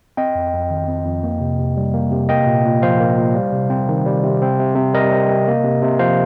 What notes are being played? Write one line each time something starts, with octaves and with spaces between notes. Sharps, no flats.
C4 D#5 G5
F2
F2
D#3
C4
F2
A#3
C3
C3
G3
A#3
C3
A#3 D#5 G5
A#2
A#2
F3 C5 F5
A#3
A#2
G3
C3
C4
D#3
G3
C3
C4
C3
C3
G3 A#4 D#5
C4
C3
A#3
C3
C3
F3 C5 F5